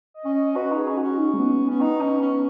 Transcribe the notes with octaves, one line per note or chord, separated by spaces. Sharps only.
D#5
C#4
D#5
F#4 B4
D#4
G#4
C#4
F#4
C#4
D#4
G#3
B3
B3
C#4
D#4
C#4
C#4